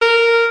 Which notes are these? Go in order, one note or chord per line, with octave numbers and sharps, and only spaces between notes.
A#4